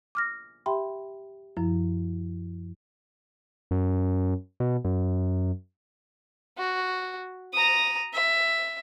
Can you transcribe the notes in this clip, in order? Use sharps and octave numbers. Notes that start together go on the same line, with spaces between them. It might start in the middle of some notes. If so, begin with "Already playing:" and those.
D6 F6 A#6
G4 E5 G5 B5 C6
F#2 F3 E4
F#2
B2
F#2
F#4
A#5 D#6
E5